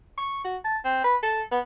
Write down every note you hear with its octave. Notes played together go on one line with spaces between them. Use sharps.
C#6
F#4
A5
C4
B4
A4
B3